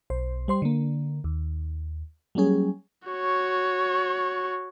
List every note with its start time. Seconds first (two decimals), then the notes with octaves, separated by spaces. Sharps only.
0.10 B1 C5
0.48 G3 C5 C6
0.62 D3 A#3
1.24 D#2
2.35 F#3 G3 A#3 C#4 G#4
3.08 F#4 C#5